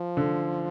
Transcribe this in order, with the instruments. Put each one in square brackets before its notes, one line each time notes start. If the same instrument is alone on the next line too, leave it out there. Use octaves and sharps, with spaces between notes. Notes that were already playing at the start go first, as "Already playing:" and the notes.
Already playing: [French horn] F3
[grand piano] D3